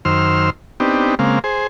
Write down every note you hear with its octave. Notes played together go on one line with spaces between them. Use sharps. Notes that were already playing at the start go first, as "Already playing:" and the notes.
F#2 D#3 C5 C6 E6 F6
B3 C4 D4 D#4 G4
C#3 G#3 A#3 C4 F5
G#4 C5